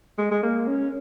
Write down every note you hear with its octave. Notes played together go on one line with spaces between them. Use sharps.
G#3
G#3
A#3
C#4